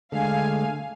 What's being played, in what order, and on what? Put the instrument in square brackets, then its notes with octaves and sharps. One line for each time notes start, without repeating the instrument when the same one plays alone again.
[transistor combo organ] D3 G#3 A3 [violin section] F5 G#5